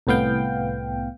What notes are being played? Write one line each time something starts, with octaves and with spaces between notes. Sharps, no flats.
C2 A2 B3 F5 G5